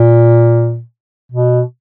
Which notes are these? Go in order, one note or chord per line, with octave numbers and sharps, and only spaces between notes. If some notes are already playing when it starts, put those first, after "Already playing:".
Already playing: A#2
B2